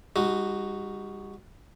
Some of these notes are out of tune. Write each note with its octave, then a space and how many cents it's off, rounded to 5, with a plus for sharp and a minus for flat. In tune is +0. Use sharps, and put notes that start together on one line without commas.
G3 +35 D#4 +0 F#4 +0